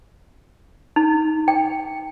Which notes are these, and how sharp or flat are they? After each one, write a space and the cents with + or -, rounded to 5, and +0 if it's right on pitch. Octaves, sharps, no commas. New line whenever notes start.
D#4 +15
G5 +5